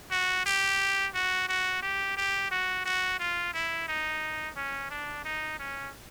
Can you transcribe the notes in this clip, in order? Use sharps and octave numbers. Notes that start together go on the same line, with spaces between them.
F#4
G4
F#4
F#4
G4
G4
F#4
F#4
F4
E4
D#4
C#4
D4
D#4
C#4